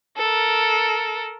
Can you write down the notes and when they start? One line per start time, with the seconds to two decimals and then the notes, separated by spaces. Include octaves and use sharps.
0.18 A4 A#4